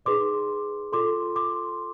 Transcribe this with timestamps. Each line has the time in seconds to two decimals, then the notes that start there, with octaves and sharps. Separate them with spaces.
0.06 D#4 G#4 B4 D5 C6 D6
0.92 F4 A4 D5 C6 D6
1.36 C6 D6